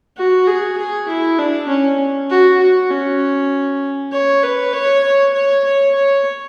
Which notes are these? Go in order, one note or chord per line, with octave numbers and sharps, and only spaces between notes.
F#4
G#4
G#4
E4
D4
C#4
F#4
F#4
C#4
C#5
B4
C#5
C#5
C#5
C#5
C#5